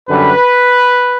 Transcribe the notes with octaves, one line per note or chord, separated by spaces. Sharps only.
F#2 D3 G3 B4